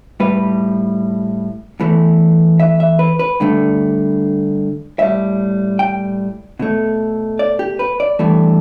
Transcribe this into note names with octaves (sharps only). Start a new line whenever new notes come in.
A2 G3 B4
E2 E3 A3
E5
E5
B4
B4
G2 D3 A3
A2 G3 E5
G5
B2 A3
D5
G4
B4
D5
G2 E3 A3